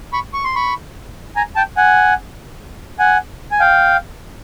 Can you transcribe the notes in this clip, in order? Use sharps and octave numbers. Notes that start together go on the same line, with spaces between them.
B5 C#6
C#6
C6
B5 C#6
G#5 A#5
G5 A5
F#5 G#5
F#5 G#5
G#5
F5 G5